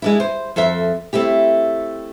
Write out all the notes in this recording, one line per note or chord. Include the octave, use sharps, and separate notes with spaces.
G#3 D4 E4
C5
F2 A4 C5 E5
A3 C4 E4 G4